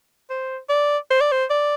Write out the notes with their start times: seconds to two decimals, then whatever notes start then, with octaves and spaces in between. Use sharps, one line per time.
0.30 C5
0.69 D5
1.11 C5
1.21 D5
1.32 C5
1.50 D5